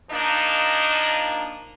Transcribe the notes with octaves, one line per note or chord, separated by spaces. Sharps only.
F3 A#3 D4 D#4